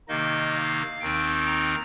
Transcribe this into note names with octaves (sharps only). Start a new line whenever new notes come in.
C3 D#3 A#3 D#4 D#5
F5
D#2 D#3 C4 D#4 G5
A#5